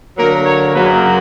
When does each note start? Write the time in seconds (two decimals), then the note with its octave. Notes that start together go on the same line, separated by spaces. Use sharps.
0.17 D3 F#3 A#3 A#4
0.46 C#5
0.74 F#2 C#3 F#3 A#3 B4